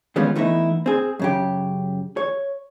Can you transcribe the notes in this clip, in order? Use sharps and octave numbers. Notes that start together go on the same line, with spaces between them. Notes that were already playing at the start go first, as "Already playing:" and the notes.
D#3 G3 G#3 B3 C#4 F4
E3 A3 B3 D#4 E4
C4 G#4
F#2 C#3 G4
C#5